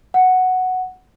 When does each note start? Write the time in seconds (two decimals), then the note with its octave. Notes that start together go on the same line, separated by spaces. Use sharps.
0.14 F#5